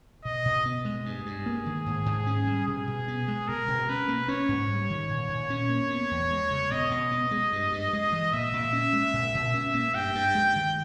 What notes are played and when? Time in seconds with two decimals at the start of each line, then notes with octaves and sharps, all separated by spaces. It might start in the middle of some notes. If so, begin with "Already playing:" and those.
0.24 B2 D#5
0.45 B2
0.66 B3
0.85 G#3
1.05 G2 G#4
1.26 G2
1.46 A#3
1.66 D#3
1.86 G#2
2.06 G#2
2.27 C#4
2.47 G3
2.67 B2 G#4
2.87 B2
3.08 B3
3.28 G#3
3.48 B2 A#4
3.68 B2
3.89 C#4 B4
4.08 A#3
4.28 C#4 C#5
4.48 G#2
4.69 G3
4.90 D#3
5.09 A#2
5.29 A#2
5.50 C#4
5.70 A#3
5.90 B3
6.11 E2
6.31 G#3
6.51 C#3
6.71 B2 D#5
6.91 B2
7.12 B3
7.31 G#3
7.52 G2
7.72 G2
7.93 G#3
8.13 E3
8.33 A#2 E5
8.53 A#2
8.73 C#4
8.93 G#3
9.13 A#2
9.35 A#2
9.54 C#4
9.74 A#3
9.94 G2 G5
10.15 G2
10.35 G#3
10.56 D#3